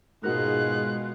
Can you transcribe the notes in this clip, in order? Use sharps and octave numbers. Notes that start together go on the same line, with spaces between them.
G#2 B2 G#3 D#4 F4 F#4 A#4 F#6